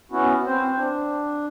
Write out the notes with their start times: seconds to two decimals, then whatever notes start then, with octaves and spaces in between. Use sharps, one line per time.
0.12 B3 C#4 E4 F#4
0.46 C4 C5
0.76 D4